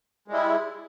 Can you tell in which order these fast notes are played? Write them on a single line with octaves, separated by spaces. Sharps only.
G#3 G3 E4